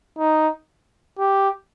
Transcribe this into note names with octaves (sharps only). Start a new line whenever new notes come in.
D#4
G4